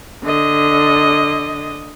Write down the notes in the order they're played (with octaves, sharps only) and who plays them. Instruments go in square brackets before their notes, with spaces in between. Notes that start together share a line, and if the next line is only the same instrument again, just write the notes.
[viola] D3 D#5